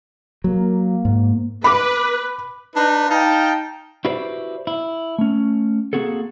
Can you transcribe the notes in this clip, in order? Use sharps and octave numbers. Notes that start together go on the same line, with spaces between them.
F#3 A#3
G#2
B4 B5 D6
D4 D#4 B4
D#4 F5 G5 A5
E4 F#4 G4 B4 C5 D5
E4
A3 C#4
A#3 C4 F#4 G#4 A4